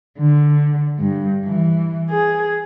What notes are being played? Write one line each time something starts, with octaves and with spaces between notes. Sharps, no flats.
D3
G2
E3
G#4